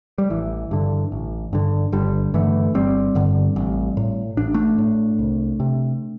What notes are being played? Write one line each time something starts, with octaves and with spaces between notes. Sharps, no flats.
G3
A1 E3
G2 D3
A1
G2 D3
G1 D3 G3
G2 D3 E3 A3
G1 G3 C4
G2 D3
A1
A2
A1 D4
A3 D4
A2
C2
C3